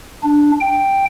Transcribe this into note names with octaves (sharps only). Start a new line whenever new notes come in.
D4
G5